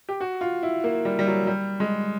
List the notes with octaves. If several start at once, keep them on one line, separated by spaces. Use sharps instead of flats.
G4
F#4
F4
E4
A#3
G3
G3
F#3
G3
G#3